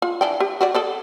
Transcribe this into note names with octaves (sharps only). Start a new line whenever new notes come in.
F4
E3 D4 G5
G4
F#4 G4 D5
G#4 A4 D5